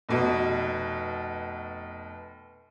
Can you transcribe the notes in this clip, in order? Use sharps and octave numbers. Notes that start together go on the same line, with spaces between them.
F1 B2